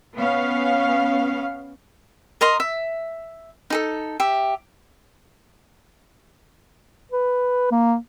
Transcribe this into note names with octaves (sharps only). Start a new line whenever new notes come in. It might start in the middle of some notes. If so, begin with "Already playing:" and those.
B3 C#4 F5
A#4 D#5 A#5 C6
E5
D#4 G#4 A4
G4 E5
B4
A#3